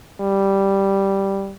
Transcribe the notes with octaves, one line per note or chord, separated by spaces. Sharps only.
G3